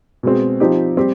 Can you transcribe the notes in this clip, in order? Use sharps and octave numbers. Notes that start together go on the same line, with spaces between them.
B2 G#3 C4
F3 C4 D#4 G4
G3 C4 G4